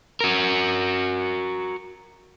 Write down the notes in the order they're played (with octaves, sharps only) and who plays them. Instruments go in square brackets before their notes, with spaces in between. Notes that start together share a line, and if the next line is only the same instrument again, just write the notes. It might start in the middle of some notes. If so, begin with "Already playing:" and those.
[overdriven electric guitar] F#4 A#4